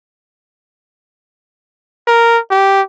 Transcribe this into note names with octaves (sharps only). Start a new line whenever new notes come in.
A#4
G4